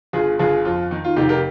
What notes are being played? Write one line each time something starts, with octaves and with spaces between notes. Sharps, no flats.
G1 F4 G#4
G1 F4 G#4
F2 F4
D#3 D#4
F4
F1 D#4 G4
G4 A#4